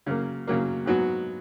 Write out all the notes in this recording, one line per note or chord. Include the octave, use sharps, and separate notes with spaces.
C#3 F#3 A#3
C#3 F#3 A#3
G#2 F#3 B3 F#4